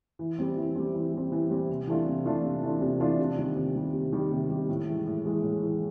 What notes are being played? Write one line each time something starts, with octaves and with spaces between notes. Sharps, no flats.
E3
G3 C4
E3
G3 C4
E3
G3 C4
E3
G3 C4
C3
E3 A3 D4 F4
C3
E3 A3 D4 F4
C3
E3 A3 D4 F4
C3
E3 A3 D4 F4
C3
D#3 G3
C3
D#3 G3
C3
D#3 G3
C3
D#3 G3
A2
E3 G#3
A2
E3 G#3
A2
E3 G#3